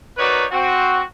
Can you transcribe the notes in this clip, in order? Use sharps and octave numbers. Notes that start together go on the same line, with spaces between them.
D#4 F#4 A#4 B4 C#5 D5
C4 F#4